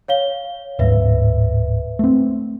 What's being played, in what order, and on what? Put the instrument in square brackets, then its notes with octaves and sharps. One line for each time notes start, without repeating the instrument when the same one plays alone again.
[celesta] C#5 F5 G7
[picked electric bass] D1 G#2 [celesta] B4 E5
[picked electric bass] A3 C4